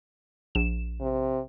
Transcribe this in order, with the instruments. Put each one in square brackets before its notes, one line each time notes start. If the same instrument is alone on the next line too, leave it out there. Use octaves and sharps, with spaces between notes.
[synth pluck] A#1 E7
[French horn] C3